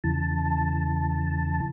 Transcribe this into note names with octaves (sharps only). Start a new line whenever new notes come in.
E2 C#3 E3 A5